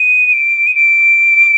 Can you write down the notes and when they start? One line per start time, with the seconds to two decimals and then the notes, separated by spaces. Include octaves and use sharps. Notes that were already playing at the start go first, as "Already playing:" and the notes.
Already playing: D#7
0.33 D7
0.67 D#7
0.75 D7